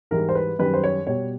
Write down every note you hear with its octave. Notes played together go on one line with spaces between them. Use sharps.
G#2 E3 G3 A#4
C5
B4
F#2 D#3 G3 B4
C5
C#5
B2 G3 C#5